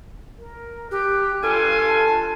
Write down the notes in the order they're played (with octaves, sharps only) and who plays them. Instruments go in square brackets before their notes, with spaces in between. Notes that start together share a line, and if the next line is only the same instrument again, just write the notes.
[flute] A#4
[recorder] G4 [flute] F#6
[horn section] G2 F4 G#5 [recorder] A4
[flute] A5